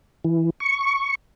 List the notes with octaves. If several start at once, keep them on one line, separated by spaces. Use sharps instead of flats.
E3
C#6